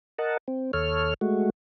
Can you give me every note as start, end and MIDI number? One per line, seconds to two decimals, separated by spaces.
0.19 0.37 70
0.19 0.37 75
0.19 0.37 78
0.19 0.37 81
0.48 0.71 60
0.73 1.14 39
0.73 1.14 69
0.73 1.14 73
0.73 1.14 89
1.21 1.50 56
1.21 1.50 57
1.21 1.50 66